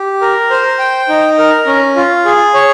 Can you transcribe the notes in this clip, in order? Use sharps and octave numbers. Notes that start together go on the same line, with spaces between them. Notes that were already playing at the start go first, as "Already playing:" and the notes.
Already playing: G4
A#4
C5
G5
D#4
A#4
C#4
F4
G#4
C#5